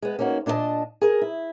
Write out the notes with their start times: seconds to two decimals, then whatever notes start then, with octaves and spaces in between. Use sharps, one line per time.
0.02 G#3 B3
0.19 A#3 C#4 D#4 F4 F#4
0.46 A#2 D4 A4 A#4 D#5 A5
1.01 G#4 A#4
1.22 E4